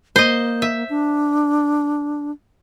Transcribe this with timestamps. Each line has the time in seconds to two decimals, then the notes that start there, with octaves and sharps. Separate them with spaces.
0.16 A#3 C5 D#5
0.62 E5
0.89 D4